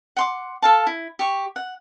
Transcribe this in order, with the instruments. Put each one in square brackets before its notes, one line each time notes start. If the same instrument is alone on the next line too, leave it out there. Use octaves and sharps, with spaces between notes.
[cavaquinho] F#5 C6 D6
A4 F5 A5
E4
G4 C#6
F#5